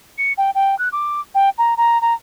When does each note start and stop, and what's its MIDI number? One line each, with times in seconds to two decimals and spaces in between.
0.18 0.33 97
0.38 0.50 79
0.55 0.78 79
0.78 0.89 90
0.92 1.21 86
1.35 1.49 79
1.58 1.74 82
1.77 2.00 82
2.01 2.14 82